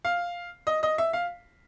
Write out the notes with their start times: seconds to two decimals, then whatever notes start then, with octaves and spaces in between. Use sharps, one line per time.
0.05 F5
0.67 D#5
0.83 D#5
0.98 E5
1.13 F5